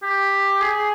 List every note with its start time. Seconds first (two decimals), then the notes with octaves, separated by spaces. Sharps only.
0.02 G4
0.60 G#4